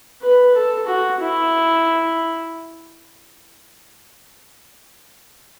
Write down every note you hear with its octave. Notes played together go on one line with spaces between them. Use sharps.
B4
A4
F#4
E4